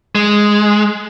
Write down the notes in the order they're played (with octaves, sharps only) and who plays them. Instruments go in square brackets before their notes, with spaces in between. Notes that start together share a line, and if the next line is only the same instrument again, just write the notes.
[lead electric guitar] G#3